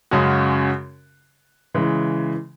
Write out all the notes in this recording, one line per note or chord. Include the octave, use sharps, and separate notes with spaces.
F#2 C#3 G#3 C#4 F#4
C#3 E3 G#3